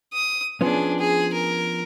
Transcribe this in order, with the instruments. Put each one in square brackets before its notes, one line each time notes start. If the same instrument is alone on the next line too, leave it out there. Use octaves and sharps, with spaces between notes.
[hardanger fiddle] D#6
[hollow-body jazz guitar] F3 B3 C#4 [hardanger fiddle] D4 G#4
[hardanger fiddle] G#4
A#4